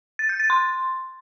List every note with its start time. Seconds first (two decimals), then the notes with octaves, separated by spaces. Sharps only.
0.19 A6
0.29 G6
0.40 A6
0.50 C6